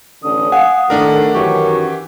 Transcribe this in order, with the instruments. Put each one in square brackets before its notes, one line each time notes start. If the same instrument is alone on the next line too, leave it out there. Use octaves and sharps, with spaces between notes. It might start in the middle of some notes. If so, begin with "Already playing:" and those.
[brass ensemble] A1 D3 C#4 [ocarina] D#6
[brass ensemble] F5 [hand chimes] F#5 [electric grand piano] G#5
[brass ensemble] A2 D#3 [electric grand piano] A3 D4 A#4
[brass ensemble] F#2 D#3 [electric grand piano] E3 G4 [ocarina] C#6